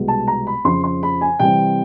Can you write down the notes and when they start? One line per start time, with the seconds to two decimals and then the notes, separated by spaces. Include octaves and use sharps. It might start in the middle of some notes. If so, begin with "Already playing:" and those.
Already playing: C2 B2 G#3 B3
0.08 A5
0.28 A#5
0.47 B5
0.64 F2 C#3 F3 C6
0.84 C6
1.03 B5
1.21 G#5
1.40 C3 E3 G3 C4 G5